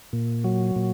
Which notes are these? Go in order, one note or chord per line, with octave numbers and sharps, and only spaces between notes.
A#2
F#3
A#2